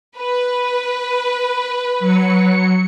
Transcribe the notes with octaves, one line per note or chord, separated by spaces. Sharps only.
B4
F#3 C#7